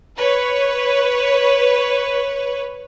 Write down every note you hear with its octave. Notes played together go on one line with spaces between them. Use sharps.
B4 C#5